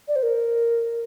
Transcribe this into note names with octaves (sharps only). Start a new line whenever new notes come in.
D5
C5
A#4